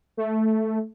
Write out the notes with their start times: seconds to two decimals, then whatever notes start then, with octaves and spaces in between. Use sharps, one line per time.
0.17 A3